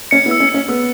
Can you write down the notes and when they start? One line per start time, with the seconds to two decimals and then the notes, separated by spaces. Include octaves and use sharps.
0.11 C#4 C#7
0.26 B3 E4
0.31 E6
0.40 C#4
0.49 C#7
0.54 C#4
0.68 B3 E6